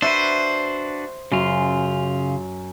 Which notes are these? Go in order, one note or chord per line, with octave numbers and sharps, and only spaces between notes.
D4 F#4 B4 C5 E5
F#2 C#3 F4